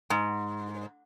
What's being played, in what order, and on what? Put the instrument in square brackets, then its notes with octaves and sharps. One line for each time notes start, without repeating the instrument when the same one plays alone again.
[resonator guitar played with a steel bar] G#2